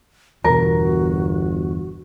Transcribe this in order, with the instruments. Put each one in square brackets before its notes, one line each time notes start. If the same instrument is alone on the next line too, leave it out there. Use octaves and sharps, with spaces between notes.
[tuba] G1 [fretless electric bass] E2 B2 [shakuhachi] F#4 [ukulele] A#4